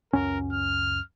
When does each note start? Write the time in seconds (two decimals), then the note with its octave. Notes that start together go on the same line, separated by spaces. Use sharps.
0.13 C#2 F#2 C#4 A#4
0.52 F6